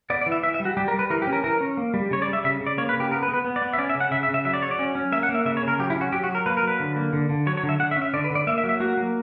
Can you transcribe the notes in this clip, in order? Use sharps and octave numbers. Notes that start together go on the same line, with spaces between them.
B3 D5
D5
E3
E5
E3 E5
E5
G3
F#4
G3 G4
A#4
G3
B4
E3 A#4
G4
C#4
A#4
E3 A#4
C#4
A#3
G3
C#3 C#5
D5
G3
E5
C#3 E5
C#3
D5
A#3 C#5
B4
C#3
G4
B3 A#4
B4
B3
B4
B3
D5
B3
E5
C#4 D5
E5
C#3
F#5
C#3 E5
E5
C#3
E5
F#3 E5
D5
F#3 C#5
D5
C#4
C#4
A#3 E5
F#5
A#3
E5
C#3 E5
C#5
C#3
A#4
F#3 G4
E4
C#4
F#4
F#3 G4
F#4
F#3
A#4
A#3 B4
A#4
F#3 B4
D3
A#3
D3
D3
F#3 C#5
C#5
D3
E5
D3 F#5
E5
C#4
E5
D3 D5
B4
D3
D5
A#3 E5
E5
F#3
E5
A#3 F#4
A#3